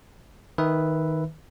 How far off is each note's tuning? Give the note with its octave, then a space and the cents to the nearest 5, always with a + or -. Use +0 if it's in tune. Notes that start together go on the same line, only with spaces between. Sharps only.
D#3 +15 B4 +0 E5 +0